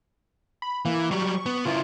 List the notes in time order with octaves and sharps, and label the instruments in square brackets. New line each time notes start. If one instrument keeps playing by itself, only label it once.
[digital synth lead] B5
[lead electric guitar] E3 [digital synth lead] A#3
[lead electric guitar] F#3 G3 [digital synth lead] C#6
[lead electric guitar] B3
[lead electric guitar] C#3 E4 [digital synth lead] F4